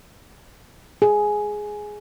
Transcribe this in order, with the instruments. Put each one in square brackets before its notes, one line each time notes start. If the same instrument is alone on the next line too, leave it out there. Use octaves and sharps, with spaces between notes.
[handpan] G#4